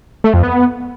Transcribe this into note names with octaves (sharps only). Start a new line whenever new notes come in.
A3
F2
B3